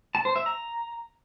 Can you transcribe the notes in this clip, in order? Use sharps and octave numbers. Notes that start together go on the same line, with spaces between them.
A5
C5
E5
A#5